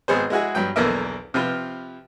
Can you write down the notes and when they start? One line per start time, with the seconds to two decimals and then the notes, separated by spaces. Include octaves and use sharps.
0.08 G#1 B3 G#4 C5
0.30 G#3 E4 F#4 G#4
0.55 G2 F#3 G5
0.76 B1 E2 D3 A#3 A#4 E5
1.34 C3 F3 F4 B4